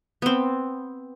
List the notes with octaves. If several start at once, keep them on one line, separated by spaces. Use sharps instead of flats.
B3 C4